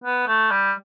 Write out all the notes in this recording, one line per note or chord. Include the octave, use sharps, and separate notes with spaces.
B3
A3
G3